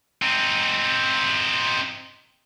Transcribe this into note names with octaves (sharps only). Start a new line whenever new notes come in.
C4 D#4